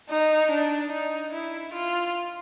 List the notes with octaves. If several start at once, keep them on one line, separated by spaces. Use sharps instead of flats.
D#4
D4
D#4
E4
F4